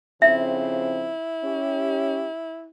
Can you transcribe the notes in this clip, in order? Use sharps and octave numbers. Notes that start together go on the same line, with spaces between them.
F2 C#3 C4 E4 E5
C#4 G4